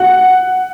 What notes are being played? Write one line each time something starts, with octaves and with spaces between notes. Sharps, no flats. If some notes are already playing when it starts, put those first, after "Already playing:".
Already playing: F#5